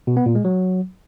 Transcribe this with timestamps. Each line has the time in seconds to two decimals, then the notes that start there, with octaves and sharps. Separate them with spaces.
0.07 B2
0.17 B3
0.26 A#2
0.35 G#3
0.45 F#3